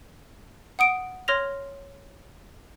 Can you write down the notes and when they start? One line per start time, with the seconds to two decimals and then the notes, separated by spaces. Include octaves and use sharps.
0.79 F#5 D#6 D7
1.28 C#5 C6 F6 A#6 F7